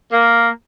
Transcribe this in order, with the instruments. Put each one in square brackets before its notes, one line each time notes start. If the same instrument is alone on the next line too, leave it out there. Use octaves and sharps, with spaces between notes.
[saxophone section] A#3